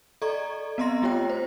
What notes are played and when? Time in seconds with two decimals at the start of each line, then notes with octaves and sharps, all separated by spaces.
0.22 A4 D5 D#5 A#5 C#6 G#6
0.78 B3 C4 D#5 A#5 C6 A#6
1.02 A3 F4 G4 C#5 G5
1.30 C5